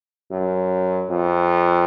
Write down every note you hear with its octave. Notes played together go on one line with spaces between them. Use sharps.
F#2
F2